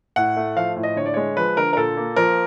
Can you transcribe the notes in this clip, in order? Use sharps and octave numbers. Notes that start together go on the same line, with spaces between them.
A2 F#5
A3
F3 F5
A2
D#5
D3 C#5
D5
G#3 C#5
F3 B4
D3 A#4
A#4
A#2 A4
A#3
F3 A#4